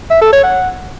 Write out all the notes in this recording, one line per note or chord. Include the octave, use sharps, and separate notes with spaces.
E5
A4
C#5
F#5